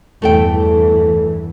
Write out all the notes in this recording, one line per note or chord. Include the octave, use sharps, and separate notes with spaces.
E2 G2 E3 A3 A4 G5